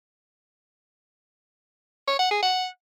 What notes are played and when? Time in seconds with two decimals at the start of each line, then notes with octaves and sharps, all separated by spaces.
2.08 C#5
2.19 F#5
2.31 G#4
2.43 F#5